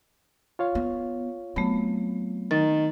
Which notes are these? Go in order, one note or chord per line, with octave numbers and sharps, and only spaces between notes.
F4 C#5 F5
B3
F#3 A3 B3 C4
D#3 A#4 A6